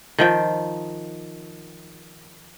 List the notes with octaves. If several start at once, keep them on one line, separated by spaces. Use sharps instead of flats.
D#3 F3 G5